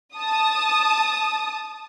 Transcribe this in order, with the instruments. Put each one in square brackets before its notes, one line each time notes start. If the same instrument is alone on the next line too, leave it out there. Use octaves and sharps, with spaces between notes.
[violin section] A5 D#6